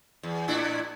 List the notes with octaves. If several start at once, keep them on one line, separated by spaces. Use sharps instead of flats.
E2
A2 D4 E4